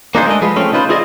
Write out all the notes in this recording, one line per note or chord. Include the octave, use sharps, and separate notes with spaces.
A#3 D4 D#4 F4 G#4 C5
G#3 A3 D4 D#5
F3 G#3 G#4 B4
A3 C4 C#4
C#3 D#4 F4 B4 C5
E4 F4 G#4 D5 D#5